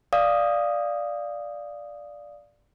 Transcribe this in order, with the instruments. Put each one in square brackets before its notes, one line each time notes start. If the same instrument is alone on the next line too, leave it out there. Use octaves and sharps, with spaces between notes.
[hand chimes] D5 F5 D#6